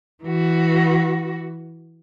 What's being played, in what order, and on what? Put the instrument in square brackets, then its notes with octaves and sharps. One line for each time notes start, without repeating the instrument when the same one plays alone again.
[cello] E3 F#4